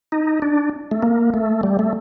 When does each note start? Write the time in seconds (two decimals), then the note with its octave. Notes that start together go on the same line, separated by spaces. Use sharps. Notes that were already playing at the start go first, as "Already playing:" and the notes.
0.12 D#4
0.42 D4
0.91 A3
1.03 A#3
1.34 A3
1.63 G3
1.79 A3